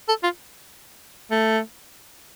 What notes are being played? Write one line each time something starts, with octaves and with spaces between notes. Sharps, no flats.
A4
F4
A3